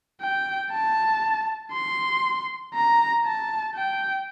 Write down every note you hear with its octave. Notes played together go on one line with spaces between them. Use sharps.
G5
A5
C6
A#5
A5
G5